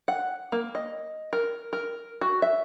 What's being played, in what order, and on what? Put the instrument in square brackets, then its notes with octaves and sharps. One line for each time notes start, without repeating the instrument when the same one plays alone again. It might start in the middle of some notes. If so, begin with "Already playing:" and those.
[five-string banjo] F#5
A#3
D#5
A#4
A#4
F#4
E5